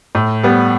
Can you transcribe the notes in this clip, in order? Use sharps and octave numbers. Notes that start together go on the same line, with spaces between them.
A2
G3 B3